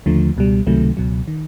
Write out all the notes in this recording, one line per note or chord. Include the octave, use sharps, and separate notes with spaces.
D#2 D3 F3 A3
C#2 B2 G3
C#2 C3 D#3 F#3 A3
C#2 B2 F#3
D#3